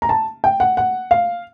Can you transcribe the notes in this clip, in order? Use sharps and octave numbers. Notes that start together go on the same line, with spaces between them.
A#5
A5
G5
F#5
F#5
F5